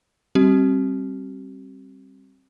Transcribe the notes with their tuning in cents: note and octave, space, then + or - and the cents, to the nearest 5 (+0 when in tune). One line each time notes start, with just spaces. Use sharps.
G3 +0 C4 +25 G4 -45